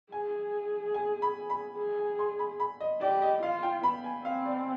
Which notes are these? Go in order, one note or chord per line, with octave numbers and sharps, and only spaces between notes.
G#4 G#5
G#5
B5
B5
G#4
G#5
C6
B5
B5
D#5
G4 D5
D#5
F4 F5
G5
B3 B5
G#5
C4 F5
D5